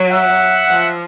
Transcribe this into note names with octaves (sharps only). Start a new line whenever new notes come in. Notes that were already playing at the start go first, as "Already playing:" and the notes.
Already playing: F#3
E5 F#5
F3